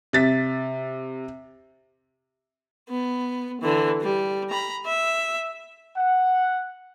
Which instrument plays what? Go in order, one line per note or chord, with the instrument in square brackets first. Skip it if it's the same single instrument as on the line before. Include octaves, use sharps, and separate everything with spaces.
[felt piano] C3 A6 B6
[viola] B3
D3 E3
G3
A#5 B5
E5
[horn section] F#5